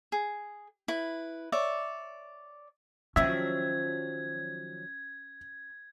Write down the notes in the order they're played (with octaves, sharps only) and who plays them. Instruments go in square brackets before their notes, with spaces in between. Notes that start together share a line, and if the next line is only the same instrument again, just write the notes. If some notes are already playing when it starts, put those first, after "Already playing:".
[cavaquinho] G#4
E4 B4
C#5 D5 E5
[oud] D#3 F3 F#3 [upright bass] C#4 [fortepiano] E5 [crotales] G#6